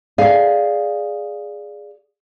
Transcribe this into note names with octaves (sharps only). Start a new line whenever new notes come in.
G#4 D5 F5